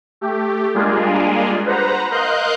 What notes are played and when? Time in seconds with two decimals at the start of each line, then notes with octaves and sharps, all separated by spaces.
0.21 A3 G4
0.75 G3 G#3 A#3 D4 F4 G#4
1.66 B4 C5 F#5 A#5
2.11 A#4 D#5 F5 C6 F#6 G6